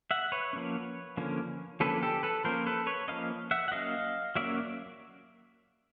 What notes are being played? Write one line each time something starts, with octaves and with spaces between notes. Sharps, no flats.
E5 F#5
B4 C#5
F3 A#3 C#4
D3 F3 A#3 C#4
D3 F3 A#3 C#4 A4 B4
G4 A4
A4 B4
F3 A#3 C#4 A#4 C5
A4 B4
B4 C#5
F3 A#3 C#4 D#5 F5
E5 F#5
F#5
F#3 A#3 C#4 D#5 F5
F#3 A#3 C#4 D5 E5